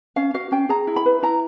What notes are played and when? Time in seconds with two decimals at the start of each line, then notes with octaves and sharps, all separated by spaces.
0.16 C#4 F5
0.34 F#4 F5
0.52 C#4 G5
0.69 G#4 A#5
0.87 E4
0.96 B5
1.06 B4
1.23 E4 A#5